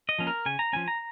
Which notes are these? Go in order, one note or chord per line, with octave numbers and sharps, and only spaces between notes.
D#5
F3 A#3 C#4
A#4
C#3 G#5
A#5
F3 A#3 C#4 G#5
A#5